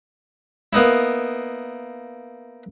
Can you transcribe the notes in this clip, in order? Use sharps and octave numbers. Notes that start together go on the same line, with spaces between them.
A#3 B3 D#4 E4